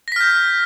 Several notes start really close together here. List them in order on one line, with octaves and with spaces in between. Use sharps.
A#6 B6 F6 G6